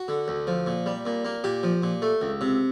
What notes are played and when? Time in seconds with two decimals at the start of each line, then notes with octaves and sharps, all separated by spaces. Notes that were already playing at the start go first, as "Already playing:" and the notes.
Already playing: F#4
0.08 D3
0.28 D2
0.47 F3
0.66 A#2
0.86 G3
1.05 A#2
1.25 A#3
1.44 A#2 G4
1.63 F3
1.83 A#2
2.02 A3
2.21 C#2
2.41 C3